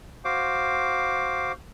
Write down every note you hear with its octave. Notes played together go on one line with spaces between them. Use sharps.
F#4 C5 F5 D6